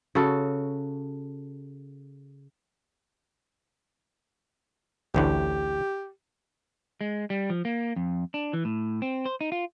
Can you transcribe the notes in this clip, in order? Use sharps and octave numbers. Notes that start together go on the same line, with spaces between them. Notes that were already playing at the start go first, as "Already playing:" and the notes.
C#3 F#4 A4
A1 D2 A2 G4
G#3
G3
F3
A#3
F2
D4
E3
A2
C4
C5
D#4
F4